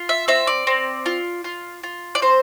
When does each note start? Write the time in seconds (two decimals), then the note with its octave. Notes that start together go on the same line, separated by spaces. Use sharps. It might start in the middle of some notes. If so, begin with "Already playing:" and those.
Already playing: F4
0.09 E5
0.28 C4 E5
0.47 D5
0.67 C4
1.06 F4
1.44 F4
1.83 F4
2.15 D5
2.22 C4 C5